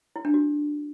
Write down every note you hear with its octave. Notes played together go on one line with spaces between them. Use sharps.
E4
D4
F#4